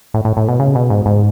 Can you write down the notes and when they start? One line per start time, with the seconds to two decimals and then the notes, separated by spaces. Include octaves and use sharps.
0.14 A2
0.25 A2
0.37 A2
0.48 B2
0.60 C#3
0.75 B2
0.90 G#2
1.06 G#2